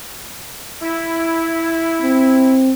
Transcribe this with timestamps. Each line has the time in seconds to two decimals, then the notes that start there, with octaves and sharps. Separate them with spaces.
0.82 E4
2.02 C4